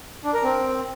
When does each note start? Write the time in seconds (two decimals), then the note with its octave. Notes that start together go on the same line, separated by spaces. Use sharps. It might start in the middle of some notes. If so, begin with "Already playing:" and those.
0.24 D4
0.34 A#4
0.43 C4